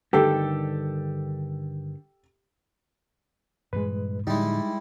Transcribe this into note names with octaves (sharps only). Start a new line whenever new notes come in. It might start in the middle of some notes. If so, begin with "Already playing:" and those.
G2 D3 D#3 G4 A4
G2 A#2 E3 G#3 B4
A2 D3 F3 G3 G#3 D#4 E4